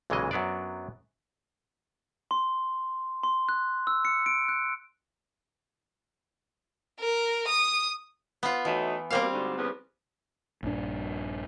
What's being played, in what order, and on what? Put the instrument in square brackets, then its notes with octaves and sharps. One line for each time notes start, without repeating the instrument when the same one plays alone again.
[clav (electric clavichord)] B1 A#2 C#3 E3 G#3 D#5
F#2 F#3 B3 D4 D5
[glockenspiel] C6
C6
F#6
E6
C#7
D7
F#6
[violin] A#4
D#6
[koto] B3 F4
[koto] E3 [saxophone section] F#3 A3 D#4
[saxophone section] B2 A#3 [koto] G3 C4 F5
[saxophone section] D2 G#2 D3
E2 C#3 B3
[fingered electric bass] A#1 G2 D4